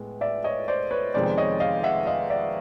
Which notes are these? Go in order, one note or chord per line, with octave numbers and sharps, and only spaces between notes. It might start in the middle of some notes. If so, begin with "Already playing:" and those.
Already playing: A2 G#3 B3
D5 E5
C#5 D#5
C5 D5
B4 C#5
F2 C3 D#3 G#3 B3 C5 D5
C#5 D#5
D#5 F5
E5 F#5
D#5 F5
D5 E5